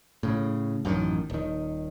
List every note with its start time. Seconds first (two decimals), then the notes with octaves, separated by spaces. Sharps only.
0.23 A2 C#3
0.85 A1 F#2 D3 D#3
1.30 D#1 D#3